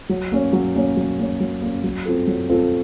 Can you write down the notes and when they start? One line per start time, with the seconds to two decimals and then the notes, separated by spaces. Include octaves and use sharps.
0.09 F#3
0.32 A#3 C#4
0.53 F#3
0.75 A#3 C#4
0.97 F#3
1.18 A#3 C#4
1.40 F#3
1.62 A#3 C#4
1.84 F#3
2.06 C4 F4 A4
2.27 F#3
2.49 C4 F4 A4